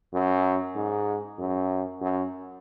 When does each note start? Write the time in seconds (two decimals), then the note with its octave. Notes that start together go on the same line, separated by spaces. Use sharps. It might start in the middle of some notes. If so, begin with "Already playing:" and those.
0.13 F#2
0.76 G#2
1.39 F#2
2.02 F#2